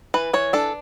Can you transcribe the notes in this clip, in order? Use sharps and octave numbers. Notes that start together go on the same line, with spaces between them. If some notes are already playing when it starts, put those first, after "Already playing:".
E3 B4
E3 C#5
D4 A4